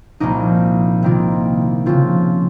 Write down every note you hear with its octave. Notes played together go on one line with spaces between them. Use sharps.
C2 A#2 F3 A#3 D#4
C3 D#3 A#3 F4
C#3 F3 C4 F4